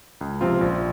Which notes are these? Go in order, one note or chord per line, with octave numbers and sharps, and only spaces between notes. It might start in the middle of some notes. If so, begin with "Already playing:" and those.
C#2
C3 F3 C4 F4
A#1